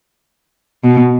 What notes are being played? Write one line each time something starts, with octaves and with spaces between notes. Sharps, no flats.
B2